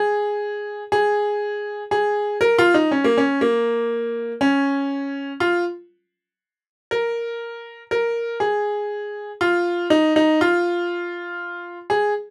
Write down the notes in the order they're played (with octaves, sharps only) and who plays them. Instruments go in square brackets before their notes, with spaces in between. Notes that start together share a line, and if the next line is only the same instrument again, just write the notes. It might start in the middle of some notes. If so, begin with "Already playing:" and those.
Already playing: [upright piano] G#4
G#4
G#4
A#4
F4
D#4
C#4
A#3
C#4
A#3
C#4
F4
A#4
A#4
G#4
F4
D#4
D#4
F4
G#4